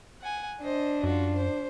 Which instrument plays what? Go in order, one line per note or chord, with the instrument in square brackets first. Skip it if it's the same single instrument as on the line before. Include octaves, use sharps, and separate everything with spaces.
[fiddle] F#5 G#5
[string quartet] D4 [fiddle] C5 D#5
[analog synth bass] F#2 [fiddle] F4 F#4
[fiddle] C5